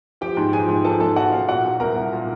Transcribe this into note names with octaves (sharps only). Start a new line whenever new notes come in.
F3 G4 G5
G#2
F3 G#4 G#5
G#2
F3 A4 A5
G#2 A4 A5
F3 F#4 F#5
G#2 F4 F5
A#2 F#4 F#5
F#3
C2 A#4 A#5
C2
A#2